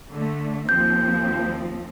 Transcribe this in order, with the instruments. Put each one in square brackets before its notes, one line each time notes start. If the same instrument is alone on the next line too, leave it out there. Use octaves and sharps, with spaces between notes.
[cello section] D3 A3
[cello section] D#2 F3 C4 [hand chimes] G6